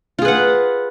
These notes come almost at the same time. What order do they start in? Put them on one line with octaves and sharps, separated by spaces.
F4 G#4 B4 F#5